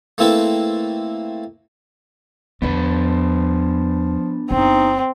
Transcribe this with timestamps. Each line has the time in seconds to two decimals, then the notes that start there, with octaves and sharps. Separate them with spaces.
0.18 A3 A#3 C4 E4 A4 B4
2.62 E2 F3 G#3 B3 D4 B4
4.51 F#1 C4 D#4